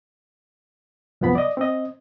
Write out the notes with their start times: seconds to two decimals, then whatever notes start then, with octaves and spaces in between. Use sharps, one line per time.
1.21 C2 F#2 F3 B3 B5
1.35 D5 D#5
1.57 C4 D#5